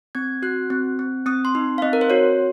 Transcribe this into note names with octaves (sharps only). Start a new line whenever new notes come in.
C4 G#6
F#4 F#6
C4
C4
C4 D#6
C6
D#4
F5
C4 D#5
A#4
C5
F#4 C#5